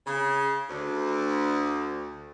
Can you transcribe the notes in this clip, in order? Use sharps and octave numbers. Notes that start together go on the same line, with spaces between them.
C#3
D2